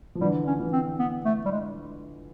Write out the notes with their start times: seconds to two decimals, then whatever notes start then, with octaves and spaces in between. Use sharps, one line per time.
0.15 F3
0.21 D3 E3 G3
0.47 C#4
0.59 D3 E3
0.72 C4
0.99 B3
1.25 A3
1.45 G3
1.51 G#3